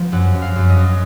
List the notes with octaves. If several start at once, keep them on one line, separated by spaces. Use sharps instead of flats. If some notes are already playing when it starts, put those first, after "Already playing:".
Already playing: F3 B3
F#2 F#5
F#2
F5
F#2
D#5
F#2